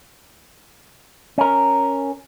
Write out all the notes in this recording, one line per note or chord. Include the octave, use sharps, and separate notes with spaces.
C#4 A#4